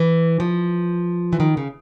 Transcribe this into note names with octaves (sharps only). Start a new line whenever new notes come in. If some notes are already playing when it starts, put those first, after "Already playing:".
Already playing: E3
F3
E3
D#3
C#3